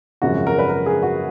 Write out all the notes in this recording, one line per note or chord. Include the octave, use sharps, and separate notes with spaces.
G#1 F#2 C#3 F3 F#4
A#4
B4
A#4
G#4
F#4